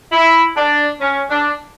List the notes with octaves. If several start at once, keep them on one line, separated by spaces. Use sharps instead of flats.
E4
D4
C#4
D4